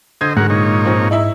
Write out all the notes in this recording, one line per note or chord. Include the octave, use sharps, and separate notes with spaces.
D3 C5 D#5 G#6
G#2 F#3 G#3 A#4 F#5
A#2 D#4 C#5
F3 C4
D#4 E4 E5